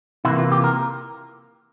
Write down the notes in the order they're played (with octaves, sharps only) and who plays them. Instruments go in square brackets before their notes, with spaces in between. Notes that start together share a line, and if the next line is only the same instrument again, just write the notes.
[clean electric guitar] C3 E3 A#3 E4
F4
G4
A#4